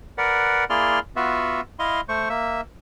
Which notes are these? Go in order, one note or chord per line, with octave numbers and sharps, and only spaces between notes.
A#4 B4 D5 F#5
A#3 E4 G#4 D5 C6 F6
B3 F4 F#4 E5
E4 D#5 F5 C6
A3 C5 C#6
A#3 E5